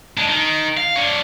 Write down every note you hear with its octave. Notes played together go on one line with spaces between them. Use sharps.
G#3 D4
D#3
F5
D4 C#5